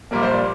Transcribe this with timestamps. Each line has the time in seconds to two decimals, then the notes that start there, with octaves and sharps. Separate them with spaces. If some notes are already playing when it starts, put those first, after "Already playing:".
0.11 A#1 A#2 G3 A#3 A#4
0.23 C5
0.32 D5